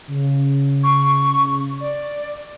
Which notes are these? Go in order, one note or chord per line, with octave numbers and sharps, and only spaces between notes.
C#3
C#6
D5